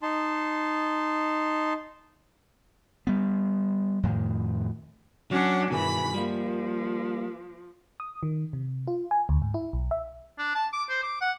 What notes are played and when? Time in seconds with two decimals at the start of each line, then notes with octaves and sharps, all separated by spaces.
0.03 D#4 A5 C6
3.07 G3 B3
4.03 F2 A2 D#3
5.31 F#3 C#4 D4 F#5
5.71 G2 B2 D#3 E3 G#4 B5
6.14 F3 G3 A#3
8.00 D#6
8.23 D#3
8.53 C3
8.87 F4
9.11 G#5
9.29 D2
9.42 G#2
9.54 E4
9.73 B1
9.91 E5
10.38 D4
10.55 A5
10.73 D6
10.89 C5
11.03 D6
11.21 F#5